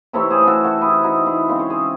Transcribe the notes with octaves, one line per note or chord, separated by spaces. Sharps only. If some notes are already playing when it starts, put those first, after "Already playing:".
C3 E3 A3 C4 A4 C#5
G#4 C5
G#4
F#4 A4
F#4 A4
E4 G#4
D#4 F#4
E4 G#4
C#3 G#3 C4 C5
C#5
G#4 C5